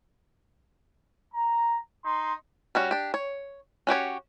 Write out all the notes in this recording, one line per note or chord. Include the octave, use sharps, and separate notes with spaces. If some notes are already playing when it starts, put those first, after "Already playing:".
A#5
D#4 C6
G3 C#4 F#4
D4 G4
C#5
C#4 F#4 G4 C#5